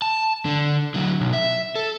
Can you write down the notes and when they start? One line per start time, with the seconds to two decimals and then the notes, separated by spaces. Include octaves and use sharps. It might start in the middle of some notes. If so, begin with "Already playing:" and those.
0.02 A5
0.45 D3
0.94 D3 F#3
1.21 B1
1.33 E5
1.75 A4